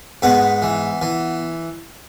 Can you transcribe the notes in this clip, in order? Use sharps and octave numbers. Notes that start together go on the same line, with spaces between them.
G#2 B3 B4
E3
E3